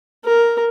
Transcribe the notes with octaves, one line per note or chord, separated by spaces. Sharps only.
A#4